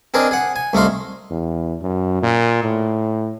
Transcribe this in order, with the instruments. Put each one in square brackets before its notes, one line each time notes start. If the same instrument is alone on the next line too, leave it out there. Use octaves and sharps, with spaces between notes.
[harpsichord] C4 D4 G#4 A#4 D#5
G#4 F#5
G#5
C2 A3 D#4 F5 C6
[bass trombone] E2
F#2
A#2
A2